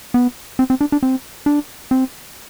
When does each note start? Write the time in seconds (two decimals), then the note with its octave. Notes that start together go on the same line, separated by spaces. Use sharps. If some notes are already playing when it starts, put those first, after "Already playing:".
0.14 B3
0.59 C4
0.70 C4
0.81 D4
0.92 D4
1.03 C4
1.46 D4
1.91 C4